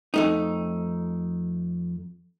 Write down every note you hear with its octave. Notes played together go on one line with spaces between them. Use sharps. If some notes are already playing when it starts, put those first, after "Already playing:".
F2 A3 D#4